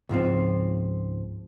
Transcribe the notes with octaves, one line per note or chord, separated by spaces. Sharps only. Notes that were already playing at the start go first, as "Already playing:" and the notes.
C#2 G#2 F3 C4